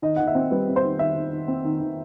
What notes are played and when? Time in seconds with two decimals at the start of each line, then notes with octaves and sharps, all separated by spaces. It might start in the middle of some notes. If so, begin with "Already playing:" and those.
0.02 D#3 D#5
0.16 D#3 F#5
0.27 E5
0.35 C4
0.51 G3 B4
0.68 C4
0.76 C5
0.84 D#3
0.99 D#3 E5
1.15 D#3
1.32 D#3
1.48 C4
1.65 D#3
1.80 D#3